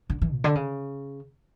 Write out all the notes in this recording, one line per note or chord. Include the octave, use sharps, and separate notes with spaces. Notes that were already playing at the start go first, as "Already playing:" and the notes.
D3
E3
A#2
D3
C#3